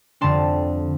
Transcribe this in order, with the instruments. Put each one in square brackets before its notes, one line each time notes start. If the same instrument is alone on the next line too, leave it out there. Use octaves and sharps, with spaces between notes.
[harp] F2 D3 G3 D4 A5 C6